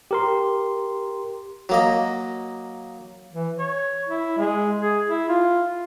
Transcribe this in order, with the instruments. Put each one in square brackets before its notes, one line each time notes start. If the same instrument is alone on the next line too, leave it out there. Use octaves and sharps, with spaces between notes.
[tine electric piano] G4 A#4 C6
[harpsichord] F#3 A#3 D#5
[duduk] E3
C#5
E4
G#3
G#4
E4
F4